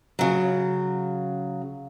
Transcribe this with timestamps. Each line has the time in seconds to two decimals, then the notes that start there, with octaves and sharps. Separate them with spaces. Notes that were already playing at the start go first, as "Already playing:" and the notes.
0.19 C#3 F#3